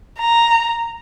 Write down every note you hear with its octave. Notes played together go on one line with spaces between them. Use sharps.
A#5